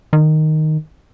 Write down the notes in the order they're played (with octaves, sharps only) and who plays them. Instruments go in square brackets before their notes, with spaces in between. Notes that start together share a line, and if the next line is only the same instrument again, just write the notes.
[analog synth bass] D#3